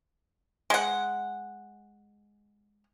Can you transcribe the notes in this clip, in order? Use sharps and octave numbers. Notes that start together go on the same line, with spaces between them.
G#3 F#5